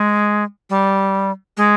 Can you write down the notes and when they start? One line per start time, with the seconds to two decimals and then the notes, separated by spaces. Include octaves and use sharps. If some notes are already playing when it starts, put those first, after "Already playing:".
Already playing: G#3
0.70 G3
1.57 G#3